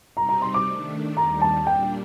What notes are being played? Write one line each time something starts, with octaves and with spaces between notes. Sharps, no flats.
C3 G3 C4 D#4 A#5
A#5
C6
D6
D#3 A3 D4
D#2 D#3 G3 A#5
A5
A#2 G3 D4 G5